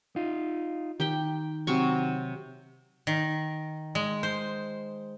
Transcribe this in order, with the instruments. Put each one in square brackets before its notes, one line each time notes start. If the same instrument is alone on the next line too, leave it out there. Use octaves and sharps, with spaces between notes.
[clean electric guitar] D#4 F4
[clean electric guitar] D#3 [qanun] G4 G5
[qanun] C3 F#3 C#6
[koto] D#3
G#3
C5